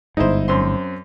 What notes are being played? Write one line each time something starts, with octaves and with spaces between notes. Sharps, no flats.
G1 G#2 D#4 E4 C5
F#2 C4 C6